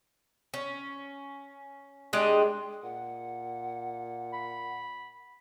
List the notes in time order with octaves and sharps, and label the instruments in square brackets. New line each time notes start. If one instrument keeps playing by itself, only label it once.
[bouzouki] C#4
G#3 D4 G4 D#5
[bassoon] A#2 [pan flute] F#5
[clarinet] B5